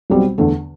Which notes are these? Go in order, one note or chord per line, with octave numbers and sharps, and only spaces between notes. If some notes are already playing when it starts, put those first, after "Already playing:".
B1 B2 G3 C4
E2 D3 A3